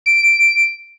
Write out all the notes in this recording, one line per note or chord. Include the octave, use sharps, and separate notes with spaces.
D7